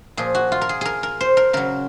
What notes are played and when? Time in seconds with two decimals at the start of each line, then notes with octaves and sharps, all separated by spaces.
0.17 A#2 F3 G#4
0.35 F#4
0.52 F4
0.61 A#4
0.69 G#4
0.81 G#4 A#4
1.03 A#4
1.21 C5
1.37 A#4
1.53 C#3 F#3 A#4